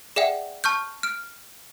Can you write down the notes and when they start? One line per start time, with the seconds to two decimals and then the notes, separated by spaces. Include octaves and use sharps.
0.16 G#4 D5 E5 F#5 G5
0.64 A5 C#6 F6 G6
1.03 F6 D7